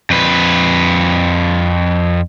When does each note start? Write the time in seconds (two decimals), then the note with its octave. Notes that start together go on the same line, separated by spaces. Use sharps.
0.10 F2 B4